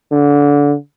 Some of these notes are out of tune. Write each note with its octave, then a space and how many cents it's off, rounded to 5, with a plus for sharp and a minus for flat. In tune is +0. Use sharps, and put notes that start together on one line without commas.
D3 -25